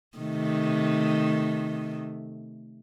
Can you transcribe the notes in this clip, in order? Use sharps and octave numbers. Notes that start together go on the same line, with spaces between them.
C3 D#3 A3